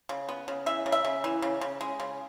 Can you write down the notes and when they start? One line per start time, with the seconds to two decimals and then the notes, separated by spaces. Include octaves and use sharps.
0.09 C#3
0.29 B3
0.48 C#3
0.66 E3 E5
0.86 C#3
0.92 E5
1.05 C#3
1.24 E3
1.42 C#3
1.61 C#3
1.81 G#3
2.00 C#3